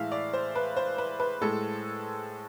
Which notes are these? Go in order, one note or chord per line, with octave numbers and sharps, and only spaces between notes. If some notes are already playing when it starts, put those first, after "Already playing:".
Already playing: A2 E3 G#3 E5 F5
D5
C5
B4
C5
B4
B4
A2 G#3 A4